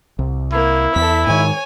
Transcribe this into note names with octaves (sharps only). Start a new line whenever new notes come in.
C2
A#3 E4
E2 A4 B6
G#2 D#3 C#5 G#5